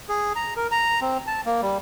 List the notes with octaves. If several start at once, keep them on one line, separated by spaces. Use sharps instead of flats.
G#4
A#5
A#4
A#5
C4
A5
A#3
G3